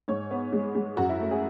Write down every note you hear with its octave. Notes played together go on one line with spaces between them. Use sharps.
G#2 C#5
B3
G#3
G#3
F#2 F#4
E4
A3
G#4